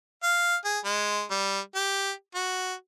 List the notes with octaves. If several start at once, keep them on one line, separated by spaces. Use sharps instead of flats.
F5
G#4
G#3
G3
G4
F#4